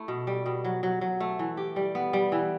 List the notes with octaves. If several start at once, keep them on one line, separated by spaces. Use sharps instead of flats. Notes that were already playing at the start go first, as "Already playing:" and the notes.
Already playing: A3 E4
B2
G3
B2
F#3
F#3
F#3
A3
E3
G4
G3
B3
G3
E3